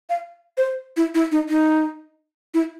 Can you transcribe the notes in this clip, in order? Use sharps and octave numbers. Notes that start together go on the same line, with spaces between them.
F5
C5
E4
E4
D#4
D#4
E4